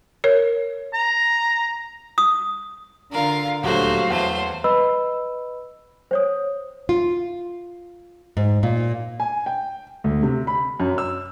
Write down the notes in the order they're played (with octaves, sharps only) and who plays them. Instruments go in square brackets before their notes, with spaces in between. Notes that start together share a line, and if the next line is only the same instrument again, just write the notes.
[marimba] A#4 C#5
[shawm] A#5
[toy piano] D#6
[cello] D3 F4 [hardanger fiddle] A#4 F5
[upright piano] D#1 D2 A3 [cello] F#3 F5 [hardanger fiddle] F#4 C5
[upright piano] E2 [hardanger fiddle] A3 C5
[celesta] B4 D#5 B5 E6
C5 C#5 D#6
[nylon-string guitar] F4
G#2
A#2
[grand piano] G#5
G5
D2
C3
B5
F#2
E6